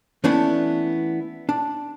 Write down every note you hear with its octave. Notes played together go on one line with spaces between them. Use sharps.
E3 A3 B3 C#4 D4 E4
D4